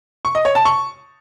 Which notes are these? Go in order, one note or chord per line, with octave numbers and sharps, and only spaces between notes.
C#6
D#5
C#5
A5
C#6